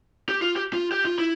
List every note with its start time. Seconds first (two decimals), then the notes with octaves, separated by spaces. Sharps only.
0.29 G4
0.42 F4
0.56 G4
0.73 F4
0.92 G4
1.05 F4
1.19 E4